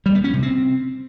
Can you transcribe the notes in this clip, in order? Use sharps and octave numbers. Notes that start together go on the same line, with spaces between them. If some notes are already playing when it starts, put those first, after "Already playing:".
G3
B3
C#4
C3
C4